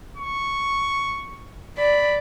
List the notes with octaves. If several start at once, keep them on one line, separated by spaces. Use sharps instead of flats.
C#6
D5 B5